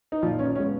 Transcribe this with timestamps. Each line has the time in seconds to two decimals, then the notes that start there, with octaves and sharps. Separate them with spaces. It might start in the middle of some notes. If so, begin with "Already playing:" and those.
0.12 D#4
0.22 A#2 F3 F4
0.39 C#4
0.55 B3 C#4
0.60 G#3